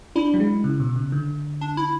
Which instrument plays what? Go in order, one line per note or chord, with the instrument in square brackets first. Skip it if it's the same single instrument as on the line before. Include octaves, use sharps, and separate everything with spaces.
[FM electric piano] D4 [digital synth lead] E4
[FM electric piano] F#3
G#3
C#3
B2
C#3
D3
[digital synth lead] D4
E4